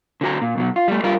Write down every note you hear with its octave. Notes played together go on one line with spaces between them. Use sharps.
D3 F#4 A#5
A#2
B1 B2 F#3
F4
G3 A3
G3 D4 F4 A#4